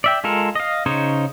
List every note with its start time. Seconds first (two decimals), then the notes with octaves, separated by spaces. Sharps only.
0.04 D5 E5 G5
0.24 G#3 F4 A4 A#4
0.55 D#5 F5
0.86 C#3 D#4 C5 C#5